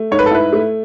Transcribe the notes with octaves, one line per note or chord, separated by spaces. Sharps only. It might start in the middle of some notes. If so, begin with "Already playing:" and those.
Already playing: A3
G#2 C#5
B4
A4
E4 B4
A3